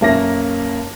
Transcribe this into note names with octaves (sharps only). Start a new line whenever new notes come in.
B1 F#2 A#3 C#4 E5 A#6